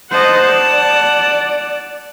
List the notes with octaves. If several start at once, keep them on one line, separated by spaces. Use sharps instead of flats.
C5 D#5 F#5 A5
D5